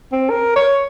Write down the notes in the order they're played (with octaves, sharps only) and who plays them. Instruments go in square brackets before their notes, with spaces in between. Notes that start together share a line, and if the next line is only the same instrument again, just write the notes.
[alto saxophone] C4
A#4
C#5